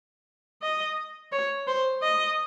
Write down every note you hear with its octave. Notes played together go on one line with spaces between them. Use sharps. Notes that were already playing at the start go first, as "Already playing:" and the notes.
D#5
C#5
C5
D#5